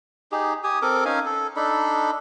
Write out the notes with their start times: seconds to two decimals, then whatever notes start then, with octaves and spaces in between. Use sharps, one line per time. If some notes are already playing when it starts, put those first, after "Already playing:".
0.32 D#4 G4 G#4
0.64 G4 G#5 D#6
0.82 C4 A4 A#4 D6
1.05 C#4 D#4 F5 G#5
1.25 A4
1.56 D4 D#4 A4 B5